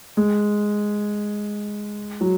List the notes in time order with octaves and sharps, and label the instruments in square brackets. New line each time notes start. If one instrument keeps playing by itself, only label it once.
[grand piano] G#3
F#3